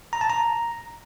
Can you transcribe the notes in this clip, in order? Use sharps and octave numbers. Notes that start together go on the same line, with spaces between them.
A#5
A5
A#5